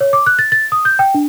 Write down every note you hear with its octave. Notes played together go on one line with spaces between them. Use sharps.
C#5
D6
F#6
A6
A6
D#6
G6
G5
D4